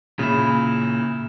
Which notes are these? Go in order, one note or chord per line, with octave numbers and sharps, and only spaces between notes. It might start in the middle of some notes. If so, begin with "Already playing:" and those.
A#2 C#3 E4